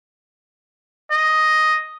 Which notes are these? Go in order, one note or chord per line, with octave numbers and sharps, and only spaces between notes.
D#5